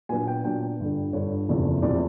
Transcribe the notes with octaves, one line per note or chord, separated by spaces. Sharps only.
A#2 F#3 B3 D4 G#5
G5
A#2 F#3 B3 D4 G5
G1 G2 D3
G1 G2 D3 C#5
F#1 E2 C3 F3 A3
E2 C3 F3 A3 D5